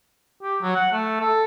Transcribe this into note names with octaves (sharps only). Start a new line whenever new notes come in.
G4
F#3
F#5
A3
A4